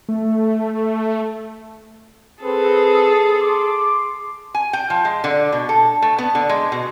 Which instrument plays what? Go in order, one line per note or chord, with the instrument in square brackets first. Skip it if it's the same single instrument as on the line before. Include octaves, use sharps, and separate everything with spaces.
[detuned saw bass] A3
[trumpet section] C4 B4 [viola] G#4 A4
[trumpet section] C6 D6
[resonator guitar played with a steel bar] G#5
G5
F3
G#3
D3
B2
A4
A3
B3
D3
G#3
B2